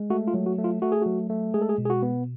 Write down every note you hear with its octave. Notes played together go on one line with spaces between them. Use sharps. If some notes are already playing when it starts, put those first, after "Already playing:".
Already playing: G#3
A3 F#4
F4
F#3
F#4
A3
F4
A3 F#4
G#4
F#3 F#4
A3
G#3 G#4
A4
G#4
B2
G#4
F#4
B3